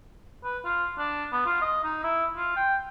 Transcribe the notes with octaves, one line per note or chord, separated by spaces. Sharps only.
B4
F4
D4
B3
F4
D#5
D#4
E4
F4
G5